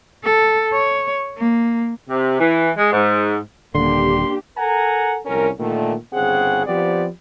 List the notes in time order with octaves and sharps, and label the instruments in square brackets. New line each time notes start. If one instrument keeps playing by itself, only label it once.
[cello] A4
C#5
A#3
[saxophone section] C3
E3
G#3
G#2
[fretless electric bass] D#1 D3 [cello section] A#3 D4 G4 [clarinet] C6
[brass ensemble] A4 A#4 F#5 G#5 A#5
C2 F2 C#4 A#4
A#2 D3 D#3 A3
G1 C#3 C4 G#4 F#5
F3 B3 C4 G4 D5